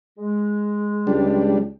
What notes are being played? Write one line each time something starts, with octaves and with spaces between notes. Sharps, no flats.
G#3
C#2 G3 D4